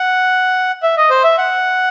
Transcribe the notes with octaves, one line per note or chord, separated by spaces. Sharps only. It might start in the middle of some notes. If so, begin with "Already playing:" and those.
Already playing: F#5
E5
D#5
C5
E5
F#5